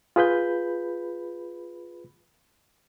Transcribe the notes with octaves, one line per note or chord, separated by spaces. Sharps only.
F4 G#4 B4 B5 G6